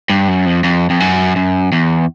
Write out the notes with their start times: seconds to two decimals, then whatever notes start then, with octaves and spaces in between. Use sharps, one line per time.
0.10 G2
0.28 F#2
0.46 F2
0.64 F2
0.90 F2
1.00 F#2
1.36 F#2
1.72 E2